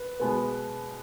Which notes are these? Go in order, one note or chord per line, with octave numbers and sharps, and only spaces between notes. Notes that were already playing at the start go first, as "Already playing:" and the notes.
Already playing: B4
B2 G#3 B3